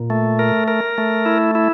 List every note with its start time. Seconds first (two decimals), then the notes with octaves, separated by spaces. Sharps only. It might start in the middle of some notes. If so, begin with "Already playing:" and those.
Already playing: A#2
0.10 A3
0.39 A#4
0.68 A#4
0.98 A3
1.26 E4
1.55 E4